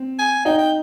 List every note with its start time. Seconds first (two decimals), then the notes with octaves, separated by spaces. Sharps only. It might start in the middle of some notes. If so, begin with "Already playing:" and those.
Already playing: C4
0.19 G#5
0.45 D#4 G5
0.58 G5